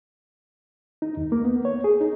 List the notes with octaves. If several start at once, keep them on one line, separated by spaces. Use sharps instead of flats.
D#4
D#2
A#3
B3
C#5
G#4
D#4